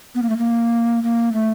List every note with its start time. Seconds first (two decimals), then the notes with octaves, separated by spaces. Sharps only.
0.15 B3
0.22 A#3
0.29 A3
0.38 A#3
1.03 A#3
1.33 A3